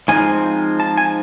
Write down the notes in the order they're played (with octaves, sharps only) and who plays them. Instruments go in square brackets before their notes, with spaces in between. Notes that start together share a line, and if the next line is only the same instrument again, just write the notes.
[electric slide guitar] A2 F3 G#3 C4 D#4 G#5
A5
G#5